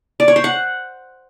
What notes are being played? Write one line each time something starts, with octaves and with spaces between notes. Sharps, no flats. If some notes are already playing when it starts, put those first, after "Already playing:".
D5
C#5
C5
F#5